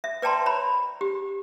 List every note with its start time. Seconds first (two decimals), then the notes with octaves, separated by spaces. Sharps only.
0.04 E5
0.22 B4 D5 G5 A5 A#5 C6
0.46 C#5 A#5 B5
1.01 G4